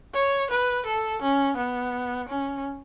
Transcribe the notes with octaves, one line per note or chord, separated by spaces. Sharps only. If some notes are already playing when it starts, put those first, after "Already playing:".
C#5
B4
A4
C#4
B3
C#4